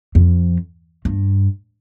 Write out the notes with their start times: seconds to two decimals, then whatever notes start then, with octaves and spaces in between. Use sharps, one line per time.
0.15 F2
1.05 G2